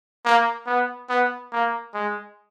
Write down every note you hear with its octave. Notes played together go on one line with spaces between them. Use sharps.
A#3
B3
B3
A#3
G#3